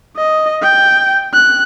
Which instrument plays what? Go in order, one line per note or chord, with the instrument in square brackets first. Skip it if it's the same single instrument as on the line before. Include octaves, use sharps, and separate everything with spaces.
[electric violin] D#5
G5
F#6